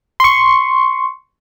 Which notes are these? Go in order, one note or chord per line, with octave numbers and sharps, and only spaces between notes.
C6 C#6